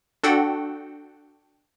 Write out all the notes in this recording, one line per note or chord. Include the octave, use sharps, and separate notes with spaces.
D4 F#4 A4 F#5 G5